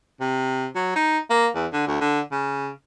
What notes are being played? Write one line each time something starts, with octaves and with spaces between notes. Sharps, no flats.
C3
F#3
D#4
A#3
E2
D3
D2
D3
C#3